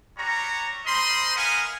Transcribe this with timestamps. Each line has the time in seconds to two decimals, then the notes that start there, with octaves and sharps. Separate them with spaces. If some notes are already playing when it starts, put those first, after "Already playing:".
0.18 G3 F#4 C#5 A#5
0.86 A#4 C5 D#5 B5 C6
1.36 A#4 B4 D#5 F5 F#5 G#5